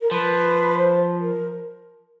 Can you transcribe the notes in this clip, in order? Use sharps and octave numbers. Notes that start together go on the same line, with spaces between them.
A#4
F3 B4
C5
A#4